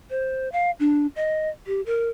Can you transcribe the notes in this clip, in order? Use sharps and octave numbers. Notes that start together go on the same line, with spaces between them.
C5
F5
D4
D#5
G4
A#4